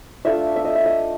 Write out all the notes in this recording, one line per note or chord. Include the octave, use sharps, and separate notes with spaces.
A3 D4 F4 E5
E5
D#5
E5
D#5